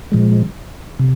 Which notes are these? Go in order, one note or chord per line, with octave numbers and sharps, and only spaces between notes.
A#2 F3 G#3
C3